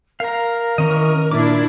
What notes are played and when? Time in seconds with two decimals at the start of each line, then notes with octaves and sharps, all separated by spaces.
0.20 A#4 F5 A#5
0.78 D#3 E3 C#4 D#5
1.31 A#2 D4 E4 D6